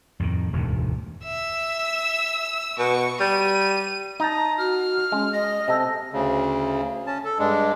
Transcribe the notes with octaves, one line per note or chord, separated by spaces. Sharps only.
F2 A2 D3 D#3
E1 D2 G#2 D#3
E5 E6
B2 C#6
G3 D#7
D#4 A5 A#5
F#4 F6
G#3 C#4
D#5 A#6
C3 A4
D2 C#3
C#4 A5
A4
G2 G#3 D4